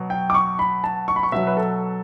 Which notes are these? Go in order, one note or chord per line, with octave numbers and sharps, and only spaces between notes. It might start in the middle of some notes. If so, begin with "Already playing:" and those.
Already playing: B2 F#3
G5
D6
C#6
B5
A5
C#6
B5
C#6
B2 F#3 E5
B4
A4